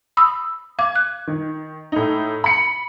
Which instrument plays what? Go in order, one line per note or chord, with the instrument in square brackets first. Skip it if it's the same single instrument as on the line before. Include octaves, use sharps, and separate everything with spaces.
[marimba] B5 D#6 E6
[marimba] F5 D6 [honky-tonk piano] G#6
[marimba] F#6
[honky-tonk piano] D#3
A2 D#4
B5 C#7